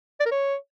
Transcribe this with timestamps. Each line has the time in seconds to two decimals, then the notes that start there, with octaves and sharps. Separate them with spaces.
0.20 D5
0.26 A#4
0.31 C#5